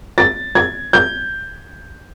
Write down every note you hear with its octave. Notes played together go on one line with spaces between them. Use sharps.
A6
G#6
G6